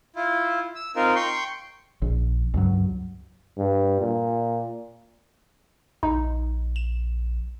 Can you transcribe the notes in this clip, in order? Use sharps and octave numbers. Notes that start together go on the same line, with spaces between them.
E4 F4
E6
C4 D#4 F4 A#4
G5 C6 C#6
A#1
C#2 G2 F#3
G2
A#2
A#1 D#4
E7